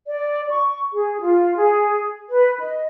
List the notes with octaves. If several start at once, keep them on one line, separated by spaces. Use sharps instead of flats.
D5
C#6
G#4
F4
G#4
B4
D#5